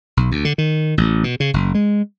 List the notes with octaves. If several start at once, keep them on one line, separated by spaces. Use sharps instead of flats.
B1
D2
D3
D#3
A1
B2
C#3
F#1
G#3